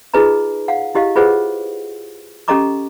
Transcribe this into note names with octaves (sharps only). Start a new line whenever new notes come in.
D#4 F4 G#4 B4 D#5 A#5
F5 F#5
E4 G4 D#5 F5
F4 G#4 B4 C5 D#5 F#5
C#4 G4 A4 D#5 A#5 D6